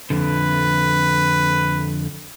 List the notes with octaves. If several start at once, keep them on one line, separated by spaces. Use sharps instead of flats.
F2 D3 B4